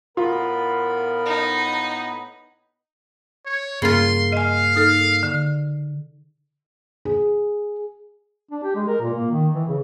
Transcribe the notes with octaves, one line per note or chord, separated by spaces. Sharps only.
A2 B3 F4 A#4 B5
D#4
C#5
G2 C#3 A#3 F4 C6
D#5 F5 G#5
D#4 A4 F6
D3
G#4
D4
G4
G#3
A#4
A#2
A#3
D#3
E3
C#3